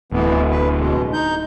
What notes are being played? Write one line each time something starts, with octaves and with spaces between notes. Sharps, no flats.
D1 E3 B3
B4
B2 G#3
D#4 G6